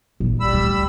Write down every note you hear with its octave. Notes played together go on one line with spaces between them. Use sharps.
A#1 A2
G3 B5 E6
D2